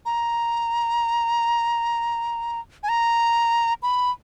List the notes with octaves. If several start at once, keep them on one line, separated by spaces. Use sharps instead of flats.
A#5
G#5
A#5
B5